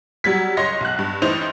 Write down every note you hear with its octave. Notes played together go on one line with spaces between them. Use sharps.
F#3 G3 G#6 B6
C#2 C#5 D#5 C6 A#6
B1 F#6
G2
A1 A2 E3 D#4 C5 F7